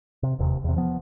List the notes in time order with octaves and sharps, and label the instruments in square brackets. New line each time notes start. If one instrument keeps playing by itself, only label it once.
[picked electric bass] C3
E1 D#2 C3
E2 C3
F3 B3